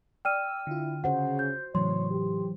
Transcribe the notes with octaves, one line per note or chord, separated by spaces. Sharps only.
D5 G5 E6 F6 D#7
D3 E4 F4
C#3 F#4 C5 F#5
G6
A2 C#3 E3 F#3 C#5 C6
G4